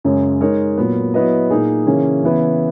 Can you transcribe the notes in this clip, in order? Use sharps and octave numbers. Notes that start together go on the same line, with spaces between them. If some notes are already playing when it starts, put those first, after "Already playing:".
F#2 C#3 G#3 C#4
G#3 D#4 A#4 C#5
A#2 F#3 B3
F#3 B3 E4 B4 D#5
A#2 A#3 D#4 G#4
C#3 E3 A#3 C#4 G#4
C#3 E3 B3 E4 B4